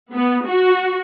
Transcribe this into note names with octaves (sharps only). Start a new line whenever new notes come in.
B3
F#4